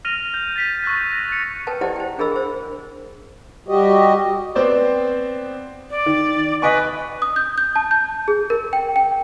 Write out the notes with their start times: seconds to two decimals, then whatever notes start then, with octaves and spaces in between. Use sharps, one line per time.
0.05 F6 A#6 D#7 F7
0.34 G6
0.56 A6 B6 D#7
0.83 C#6 E6 F#6 G6 A6
1.12 A#6
1.29 A6 C#7
1.67 A4 B4 G5 A5
1.81 E4 G4 C5 D5 D#5 F#5
1.96 C5 G5
2.18 D4 G#4 A#4 D#5 B5 E6
2.32 G#4 C5
3.68 G3 F#4 G4 D#5
4.55 B3 C4 C5 D5
5.90 D5
6.06 D#3
6.62 B4 D#5 G#5 C#6
7.22 D#6
7.36 G6
7.58 G6
7.76 A5
7.91 G6
8.28 G#4
8.50 A#4
8.73 G5
8.96 G5